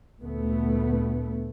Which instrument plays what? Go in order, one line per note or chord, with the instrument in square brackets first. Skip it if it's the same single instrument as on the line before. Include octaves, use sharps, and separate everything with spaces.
[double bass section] D2 A#2 A3 B3